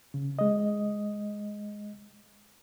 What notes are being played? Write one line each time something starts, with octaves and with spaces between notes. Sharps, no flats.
C#3
G#3 D#5